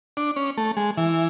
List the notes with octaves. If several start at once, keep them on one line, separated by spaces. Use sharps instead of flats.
D4
C#4
A3
G#3
E3